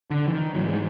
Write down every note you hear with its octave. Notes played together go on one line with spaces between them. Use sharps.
D3
E3
D#3
G#2 E3 F#3
G#3